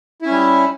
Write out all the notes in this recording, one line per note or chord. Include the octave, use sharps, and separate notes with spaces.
G3 C#4 E4